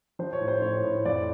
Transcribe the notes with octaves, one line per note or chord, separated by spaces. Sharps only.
F3 C5
C#5
A2
C5
A2 C#5
A2
F2 D5